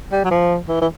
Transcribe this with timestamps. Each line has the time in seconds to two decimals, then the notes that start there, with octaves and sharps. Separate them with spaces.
0.12 G3
0.24 F#3
0.31 F3
0.68 E3
0.81 E3